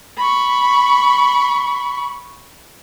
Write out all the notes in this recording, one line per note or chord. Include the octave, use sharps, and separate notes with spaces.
B5 C#6